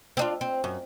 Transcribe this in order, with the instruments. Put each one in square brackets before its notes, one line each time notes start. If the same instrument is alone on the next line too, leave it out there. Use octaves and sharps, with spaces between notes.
[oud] C4 D4 F4
C4
F#2